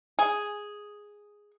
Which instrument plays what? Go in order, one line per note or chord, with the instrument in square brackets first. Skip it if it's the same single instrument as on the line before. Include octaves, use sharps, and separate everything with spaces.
[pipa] G#4